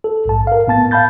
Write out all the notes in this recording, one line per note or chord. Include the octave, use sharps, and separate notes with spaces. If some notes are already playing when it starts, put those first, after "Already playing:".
A4
A#1 G#2 A5
A#4 F5
A2 B3 A5 A6
F5 A5 B5 G6 A6